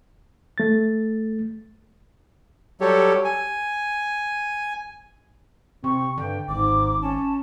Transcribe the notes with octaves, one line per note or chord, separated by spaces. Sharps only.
A3 A6
F#3 G3 G4 A4 C#5
G#5
C3 C4 C#6
G2 D3 G5
G#1 G#2 D6
C#4 A5